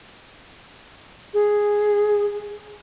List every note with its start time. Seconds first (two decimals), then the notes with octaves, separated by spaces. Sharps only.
1.34 G#4